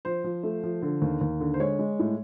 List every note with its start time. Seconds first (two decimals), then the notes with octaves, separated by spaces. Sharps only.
0.05 F3 C5
0.24 F3
0.43 A3
0.64 F3
0.82 D3
1.02 D#2
1.21 D#2
1.40 D3
1.54 C5
1.60 G#3 C#5
1.79 G#3
1.99 A2